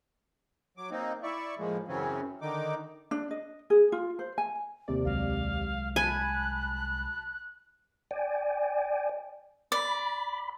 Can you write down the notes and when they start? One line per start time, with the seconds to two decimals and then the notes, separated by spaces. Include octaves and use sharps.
0.77 F#3 D6
0.91 A#3 C4 D#4
1.23 E4 D5 E5 C#6
1.59 A2 F3 G#3 A#3
1.88 F#2 C#3 E3 F#3 C4 C#4
2.41 D3 D#3 D#4 D6
3.11 D4
3.31 D#5
3.70 G#4
3.92 F4
4.19 C5
4.38 G#5
4.88 D#2 C3 D5
5.05 C2 F#3 G#3 F5
5.96 G#5 A5 B5 F#6
8.11 D5 G5 G#5
9.72 D5 B5